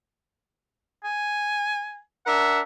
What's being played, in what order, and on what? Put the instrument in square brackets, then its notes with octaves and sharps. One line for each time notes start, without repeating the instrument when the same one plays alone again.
[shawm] G#5
[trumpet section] D4 A#4 E5 [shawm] F#5